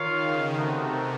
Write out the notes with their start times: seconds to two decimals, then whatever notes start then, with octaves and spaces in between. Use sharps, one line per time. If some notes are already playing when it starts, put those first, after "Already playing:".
Already playing: D#3 F4 A#4 C#5 F5
0.19 C#3
0.55 C3 A3 C4 D#4 F#4 A#4